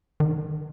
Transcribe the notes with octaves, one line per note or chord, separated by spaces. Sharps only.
D#3